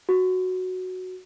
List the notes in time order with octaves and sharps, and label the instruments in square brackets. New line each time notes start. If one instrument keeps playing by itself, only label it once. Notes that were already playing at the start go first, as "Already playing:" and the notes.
[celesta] F#4